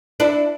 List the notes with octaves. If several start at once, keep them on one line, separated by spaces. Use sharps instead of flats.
D4 E4